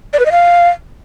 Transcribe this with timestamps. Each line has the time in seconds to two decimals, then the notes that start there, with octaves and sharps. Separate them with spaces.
0.13 D5
0.19 B4
0.26 D#5
0.32 F5